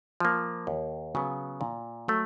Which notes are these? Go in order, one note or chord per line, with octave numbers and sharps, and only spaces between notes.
F3 A#3
D#2
C#3 F#3 B3
A#2
F#3 A3